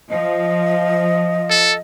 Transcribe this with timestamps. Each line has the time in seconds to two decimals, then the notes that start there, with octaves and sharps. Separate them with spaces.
0.10 F3 D#5
1.50 A4